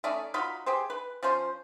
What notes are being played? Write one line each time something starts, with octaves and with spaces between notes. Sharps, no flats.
A3 C#4 D#4 D5
F#3 D#4 F4 B5
G4 G#4 C5
B4
F3 C#4 C5 C6